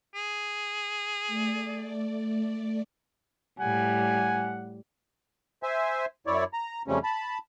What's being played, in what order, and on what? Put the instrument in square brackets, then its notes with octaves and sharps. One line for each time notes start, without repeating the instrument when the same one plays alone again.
[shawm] G#4
[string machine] A3 D5
[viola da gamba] A2 G3 [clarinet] F#5 [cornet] G#5
[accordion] C5 E5 G#5
F#2 E4 C#5 D5
A#5
F2 C#3 F3 G3 A3 C#4
A5 B5